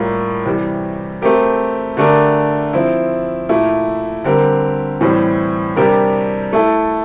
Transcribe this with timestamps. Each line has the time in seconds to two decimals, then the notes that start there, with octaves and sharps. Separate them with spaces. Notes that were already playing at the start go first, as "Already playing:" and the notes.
Already playing: A2 G3 A#3 F4
0.46 C3 E3 G3
1.22 A3 C4 G4 A#4
1.97 D3 A3 D4 G4 A#4
2.73 F3 C4 E4
3.49 A#2 A3 E4
4.24 D3 G3 C4 G4 A#4
5.01 A2 E3 G3 C4
5.76 C3 G3 D4 G4 A#4
6.53 A3 E4 A4